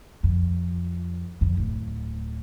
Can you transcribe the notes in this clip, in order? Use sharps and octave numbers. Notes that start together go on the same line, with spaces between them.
F2
F2
D1